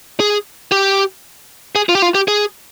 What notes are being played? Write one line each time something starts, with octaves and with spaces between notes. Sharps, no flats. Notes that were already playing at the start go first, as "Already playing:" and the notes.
G#4
G4
G#4
F4
G4
F4
G4
G#4